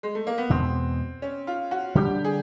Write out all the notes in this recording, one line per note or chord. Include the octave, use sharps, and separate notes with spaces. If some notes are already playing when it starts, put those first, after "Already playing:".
G#3
A3
A#3
B3
E2 B2 G#3 C4
C#4
F4
F#4
D3 G3 A#3 D4 G4
G#4